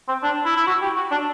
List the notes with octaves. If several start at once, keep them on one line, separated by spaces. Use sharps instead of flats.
C4
D4
E4
E4
F#4
G4
F#4
D4